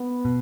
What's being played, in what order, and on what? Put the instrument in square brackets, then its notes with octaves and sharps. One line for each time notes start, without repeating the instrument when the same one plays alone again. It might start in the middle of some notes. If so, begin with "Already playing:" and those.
Already playing: [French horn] B3
[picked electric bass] B2